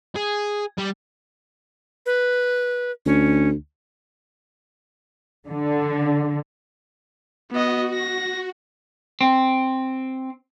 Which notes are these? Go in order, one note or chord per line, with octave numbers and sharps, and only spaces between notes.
G#4
G3
B4
D2 C#4
D3
B3 F#4 D#5
A#6
C4